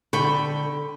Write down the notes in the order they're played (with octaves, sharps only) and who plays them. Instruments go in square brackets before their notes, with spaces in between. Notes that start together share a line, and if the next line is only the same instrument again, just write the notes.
[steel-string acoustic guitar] D3 [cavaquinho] G5 B5 C#6